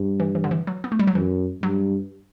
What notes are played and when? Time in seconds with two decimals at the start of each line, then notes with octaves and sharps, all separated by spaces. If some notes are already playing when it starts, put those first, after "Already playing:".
Already playing: G2
0.20 E3
0.35 E3
0.44 D3
0.51 E3
0.67 F#3
0.84 B3
0.92 A3
0.99 G3
1.07 F#3
1.15 F#2 E3
1.63 G2 F#3